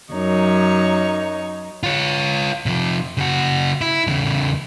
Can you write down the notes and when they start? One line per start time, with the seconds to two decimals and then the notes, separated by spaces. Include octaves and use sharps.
0.13 F#2 D#4 C#5
1.83 F4 C#5
2.66 C3 F3
3.17 C#3 F#4
3.81 E4
4.07 E2 C#3